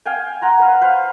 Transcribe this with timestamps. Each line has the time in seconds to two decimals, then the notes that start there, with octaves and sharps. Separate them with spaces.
0.05 F5 G5 G#5
0.42 F#5 A#5 C6
0.59 B4 F5
0.81 B4 C5 F5